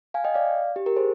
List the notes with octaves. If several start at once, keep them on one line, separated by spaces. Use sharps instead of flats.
F5 G#5
D#5 G5
D5 F5
G4
G4 A#4
G#4 C5